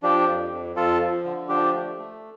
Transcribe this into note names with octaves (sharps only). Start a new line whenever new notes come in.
F3 D4 G4
F2
F2
F2 F4 A4
F3
D3
F3 D4 G4
A3
A3